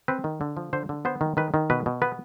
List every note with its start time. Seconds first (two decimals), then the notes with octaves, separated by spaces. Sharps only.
0.08 C4 B4
0.24 D#3
0.41 D3
0.57 F3
0.73 D3 C5
0.89 D3
1.05 B3 C5
1.21 D#3
1.37 D#3 B4
1.54 D#3
1.70 B2 B4
1.86 B2
2.02 B3 B4